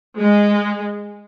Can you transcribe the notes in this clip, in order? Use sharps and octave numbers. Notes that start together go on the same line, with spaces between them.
G#3